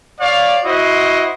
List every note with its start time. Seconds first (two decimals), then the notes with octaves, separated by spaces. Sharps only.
0.21 C#5 D5 F5
0.64 E4 F#4 C5 D#5